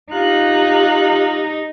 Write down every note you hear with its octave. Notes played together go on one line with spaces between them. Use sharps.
D#4 F4 G4 F#6